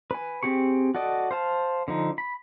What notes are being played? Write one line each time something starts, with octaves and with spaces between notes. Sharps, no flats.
B4 G#5
C4 G4 G#4 C#6
F#4 A4 D5 D#5
C5 F5 A5
D3 F3 D#4
B5